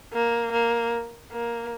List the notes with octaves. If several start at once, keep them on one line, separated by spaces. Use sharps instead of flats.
A#3
A#3
A#3